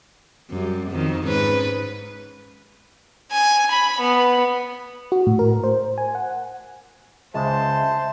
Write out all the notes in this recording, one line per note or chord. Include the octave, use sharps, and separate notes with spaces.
F#2 G3
F2 D#3
G#2 C#4 B4
G#5
B5
B3
F#4
A2
A#4
C5
G#5
F#5
C#2 G#3 C5 E5 A5